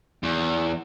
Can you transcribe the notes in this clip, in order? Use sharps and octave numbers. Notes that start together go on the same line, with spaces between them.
E2